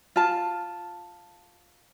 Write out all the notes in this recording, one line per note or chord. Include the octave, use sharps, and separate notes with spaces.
F4 A5